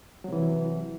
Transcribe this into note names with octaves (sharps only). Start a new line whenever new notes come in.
C3 E3 F#3